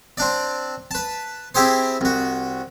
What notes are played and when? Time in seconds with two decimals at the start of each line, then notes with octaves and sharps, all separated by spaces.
0.18 C4 D4 D5
0.91 B4 A5
1.55 C4 E4 G4 G#4 C5
2.01 C2 F#4